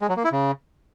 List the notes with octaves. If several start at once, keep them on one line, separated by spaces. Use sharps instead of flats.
G#3
F#3
A#3
E4
C#3